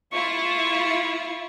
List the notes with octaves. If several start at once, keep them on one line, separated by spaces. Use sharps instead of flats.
E4 F4 C#6